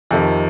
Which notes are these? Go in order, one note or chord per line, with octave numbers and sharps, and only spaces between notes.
F2 C3 D#3